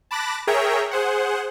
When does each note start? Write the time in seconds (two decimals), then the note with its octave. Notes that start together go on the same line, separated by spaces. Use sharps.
0.11 A5 B5 D6 F#6 A6 A#6
0.47 G#4 A#4 C#5 E5 G5 A#5
0.91 G#4 C5 F#5